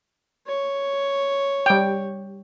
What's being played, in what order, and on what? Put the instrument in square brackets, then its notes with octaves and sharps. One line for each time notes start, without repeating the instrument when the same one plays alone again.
[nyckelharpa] C#5
[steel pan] G3 G5